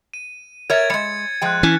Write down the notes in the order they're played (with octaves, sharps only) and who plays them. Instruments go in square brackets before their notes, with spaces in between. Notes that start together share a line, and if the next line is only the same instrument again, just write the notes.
[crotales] D#7
[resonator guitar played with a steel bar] A#4 C#5 E5 [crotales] G#6 A6
[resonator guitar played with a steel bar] G3 G#3 [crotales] C#7
[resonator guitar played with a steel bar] F3 G#3 G5 [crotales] F#6 D#7
[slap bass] E3 [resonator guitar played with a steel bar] C#4